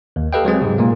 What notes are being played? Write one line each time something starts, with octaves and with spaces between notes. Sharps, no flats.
D#2
G4 A4 B4 D#5 F5 G5
F#3 G#3 C4 G#4
G#2 C3
A#2 G#3 A#3